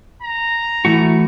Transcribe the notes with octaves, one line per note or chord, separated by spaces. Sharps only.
A#5
E3 A3 E4 F#4